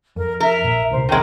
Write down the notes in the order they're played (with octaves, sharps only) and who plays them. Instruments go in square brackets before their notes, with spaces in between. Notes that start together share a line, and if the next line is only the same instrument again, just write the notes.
[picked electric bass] F2 [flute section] A#4
[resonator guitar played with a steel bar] A#4 [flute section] E5
[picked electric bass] A#1 A#2
[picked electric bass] C#2 C3 [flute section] C5
[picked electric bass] E1 B1 C4 [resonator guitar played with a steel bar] D#3 G#3 [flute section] A#4 C#5 G5